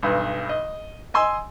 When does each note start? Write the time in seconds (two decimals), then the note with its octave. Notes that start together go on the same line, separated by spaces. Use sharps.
0.03 B1 G2
0.49 D#5
1.14 D#5 G#5 C6 E6